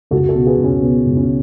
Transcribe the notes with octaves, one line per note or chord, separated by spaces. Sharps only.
C#2 F#4 A4
F#4 A4
B2
G#4 B4
C#2
C#4
B2 B3
C#2
C#4